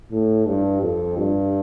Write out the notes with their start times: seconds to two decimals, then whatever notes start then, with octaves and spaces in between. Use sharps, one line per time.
0.12 A2
0.46 G2
0.82 F2
1.18 G2